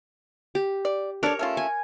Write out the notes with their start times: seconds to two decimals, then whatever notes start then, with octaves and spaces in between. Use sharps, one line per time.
0.55 G4
0.85 D5
1.23 D4 A4 A#4 C#5 D5
1.39 A3 C#4 F4
1.57 G#5